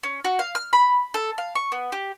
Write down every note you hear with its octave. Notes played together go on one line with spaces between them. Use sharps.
C#4
F#4
F5
F6
B5
A4
F5
C#6
B3
G4